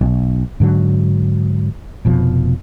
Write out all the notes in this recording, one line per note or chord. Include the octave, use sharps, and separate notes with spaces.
B1
G#2 D3 F#3
F1 B2 F3